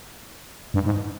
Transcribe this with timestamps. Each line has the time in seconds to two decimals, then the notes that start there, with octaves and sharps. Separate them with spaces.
0.74 G2
0.85 G#2